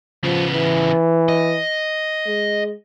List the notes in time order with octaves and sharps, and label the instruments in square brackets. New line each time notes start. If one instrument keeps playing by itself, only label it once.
[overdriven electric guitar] C#3 B3 [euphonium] F3
[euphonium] E3
[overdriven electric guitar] D#5
[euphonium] G#3